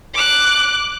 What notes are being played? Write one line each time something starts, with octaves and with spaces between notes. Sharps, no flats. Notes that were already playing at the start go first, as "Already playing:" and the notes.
D6 F#6